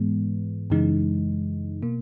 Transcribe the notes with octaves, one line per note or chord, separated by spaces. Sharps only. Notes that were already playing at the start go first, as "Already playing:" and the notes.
Already playing: G#2 E3 G#3 B3
F#2 C#3 E3 G#3 D#4
B2 A#3